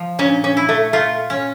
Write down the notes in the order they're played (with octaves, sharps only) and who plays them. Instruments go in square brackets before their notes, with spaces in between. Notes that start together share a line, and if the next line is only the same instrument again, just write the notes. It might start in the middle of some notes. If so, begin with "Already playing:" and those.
Already playing: [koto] F3
[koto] A#2 [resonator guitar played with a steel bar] C#4
[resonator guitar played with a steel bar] C#4
[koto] E4
[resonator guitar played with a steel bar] A3
[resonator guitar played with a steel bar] A3 [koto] F4
[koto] C#4